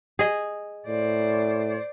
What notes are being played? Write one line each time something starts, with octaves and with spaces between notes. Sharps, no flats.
G#4 D#5
A2 C5 D5